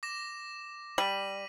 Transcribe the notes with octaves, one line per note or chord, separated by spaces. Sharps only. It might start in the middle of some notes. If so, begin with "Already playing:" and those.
D6 A#6 E7
G3 B6 D#7 F#7